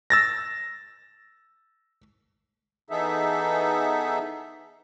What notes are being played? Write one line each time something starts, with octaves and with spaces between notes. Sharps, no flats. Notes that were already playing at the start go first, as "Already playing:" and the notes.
E6 A6 A#6
E3 B3 D#4 G#4 A4 E5